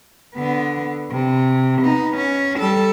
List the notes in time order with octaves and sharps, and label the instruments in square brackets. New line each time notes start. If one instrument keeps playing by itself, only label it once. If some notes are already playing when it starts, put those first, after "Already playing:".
[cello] D3 B3
C3
B3 D#4
C#4
G3 A4